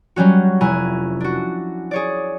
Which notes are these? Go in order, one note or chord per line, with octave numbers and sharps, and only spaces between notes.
F#3 G3 C#4 F#4
F1 E4 G#5 A#5 F#6
D4 F#4
G#4 C#5 D5